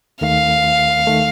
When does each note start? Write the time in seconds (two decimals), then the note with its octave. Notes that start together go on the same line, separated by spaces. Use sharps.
0.21 D#2 D#3 A3 F5
1.07 D#3 A3